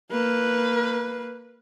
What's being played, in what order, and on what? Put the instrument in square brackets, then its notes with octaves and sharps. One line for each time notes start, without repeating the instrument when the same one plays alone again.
[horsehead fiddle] A#3 B4